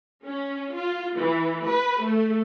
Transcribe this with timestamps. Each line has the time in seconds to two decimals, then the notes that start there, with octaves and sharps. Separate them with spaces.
0.24 C#4
0.73 F4
1.18 E3
1.68 B4
2.02 A3